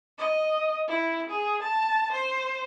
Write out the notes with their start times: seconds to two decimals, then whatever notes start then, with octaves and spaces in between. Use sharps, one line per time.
0.18 D#5
0.88 E4
1.29 G#4
1.62 A5
2.12 C5